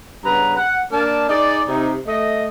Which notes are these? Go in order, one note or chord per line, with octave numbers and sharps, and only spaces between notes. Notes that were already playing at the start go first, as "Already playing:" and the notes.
G2 C#3 B3 B4 A#5
F#5
A#3 D4 D5 A5
D#4 G#4 D5
C3 D#4
A3 D#5